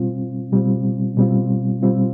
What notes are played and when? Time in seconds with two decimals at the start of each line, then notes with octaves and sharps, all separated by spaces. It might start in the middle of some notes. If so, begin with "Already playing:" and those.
Already playing: B2 G3 C4 F4
0.52 B2 G3 C4 F4
1.17 B2 G3 C4 F4
1.82 B2 G3 C4 F4